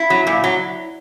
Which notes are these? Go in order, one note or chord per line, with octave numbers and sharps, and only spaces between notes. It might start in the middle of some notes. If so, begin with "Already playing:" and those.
Already playing: E4
F#3
A#2
F#3